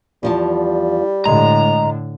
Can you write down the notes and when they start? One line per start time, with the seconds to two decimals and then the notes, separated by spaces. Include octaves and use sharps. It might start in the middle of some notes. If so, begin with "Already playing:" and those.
0.23 E2 F3 G3 A5
1.25 A2 D3 G#3 A#5